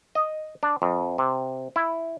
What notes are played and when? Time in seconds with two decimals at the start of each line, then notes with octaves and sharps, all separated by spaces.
0.15 D#5
0.63 D4
0.82 F2
1.18 C3
1.76 E4